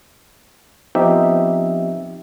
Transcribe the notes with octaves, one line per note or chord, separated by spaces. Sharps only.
F3 B3 C4 D#4 G4 E5